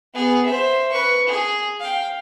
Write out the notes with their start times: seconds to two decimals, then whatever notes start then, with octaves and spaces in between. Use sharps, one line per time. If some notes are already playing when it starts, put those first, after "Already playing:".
0.14 B3 G#4
0.45 C5 E5
0.92 B4 C#6
1.27 G#4
1.80 F5 G5